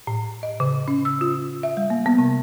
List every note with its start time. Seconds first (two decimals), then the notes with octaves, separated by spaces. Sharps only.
0.07 A2
0.43 D#5
0.60 C#3
0.88 C#4
1.05 E6
1.21 F4
1.63 E5
1.77 G3
1.90 A#3
2.06 B3
2.18 C3